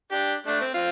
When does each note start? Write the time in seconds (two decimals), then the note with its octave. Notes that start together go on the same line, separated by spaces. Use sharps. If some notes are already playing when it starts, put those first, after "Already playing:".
0.11 D4 G4
0.47 A3 D4
0.61 C4
0.74 C4 F4